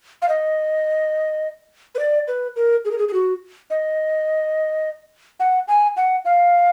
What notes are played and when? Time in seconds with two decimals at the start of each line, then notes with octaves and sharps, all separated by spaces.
0.22 F5
0.29 D#5
1.95 B4
1.99 D5
2.28 B4
2.56 A#4
2.85 G#4
2.91 A#4
2.98 G#4
3.08 G#4
3.13 F#4
3.70 D#5
5.40 F#5
5.68 G#5
5.97 F#5
6.25 F5